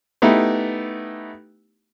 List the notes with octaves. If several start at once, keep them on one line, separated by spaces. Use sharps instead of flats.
A3 B3 D#4 E4 G4